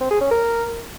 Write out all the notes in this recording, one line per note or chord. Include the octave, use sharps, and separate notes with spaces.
C4
G#4
C#4
A#4